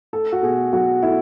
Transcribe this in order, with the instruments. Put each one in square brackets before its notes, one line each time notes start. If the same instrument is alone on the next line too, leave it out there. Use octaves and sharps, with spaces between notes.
[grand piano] A3 A4
F#4
B2 G#4
F#3 F#4
A3 E4